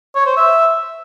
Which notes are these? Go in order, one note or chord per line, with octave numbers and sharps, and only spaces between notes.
C#5
C5
E5